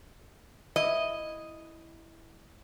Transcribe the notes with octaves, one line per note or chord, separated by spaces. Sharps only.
E4 D#5